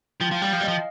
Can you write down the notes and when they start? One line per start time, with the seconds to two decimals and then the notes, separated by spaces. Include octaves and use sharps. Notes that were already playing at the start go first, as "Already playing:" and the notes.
0.20 F3 G5
0.31 F3 F5
0.42 G3 G5
0.52 F3 F5
0.60 G3
0.63 F3 D#5